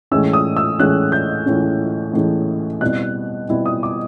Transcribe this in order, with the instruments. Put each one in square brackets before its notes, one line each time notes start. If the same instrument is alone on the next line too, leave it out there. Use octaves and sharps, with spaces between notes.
[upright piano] A2 E3 G#3 C#4 E6
D#6
E6
A2 E3 G#3 C#4 F#6
G6
A2 E3 G#3 C#4
A2 E3 G#3 C#4
B2 G3 C4 E4 F#6
B2 G3 C4 E4
D#6
D6